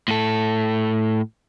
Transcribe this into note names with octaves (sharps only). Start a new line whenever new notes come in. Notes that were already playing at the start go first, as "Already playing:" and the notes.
A2 A4